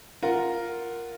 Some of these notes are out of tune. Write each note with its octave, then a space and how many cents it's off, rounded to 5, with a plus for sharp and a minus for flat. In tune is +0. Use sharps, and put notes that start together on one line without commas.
F4 +0 A#4 +0 F#5 +0